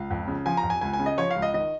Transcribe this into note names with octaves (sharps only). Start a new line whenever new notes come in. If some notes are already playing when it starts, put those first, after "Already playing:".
Already playing: C#2 F5
F2
C#3
F3 G#5
A#5
F2
G#5
C#2 G#5
G#5
C#3
D#5
F3 C#5
F5
C#2
D#5
D#3 D#5